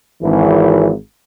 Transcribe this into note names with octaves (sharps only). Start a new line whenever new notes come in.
G#1 E3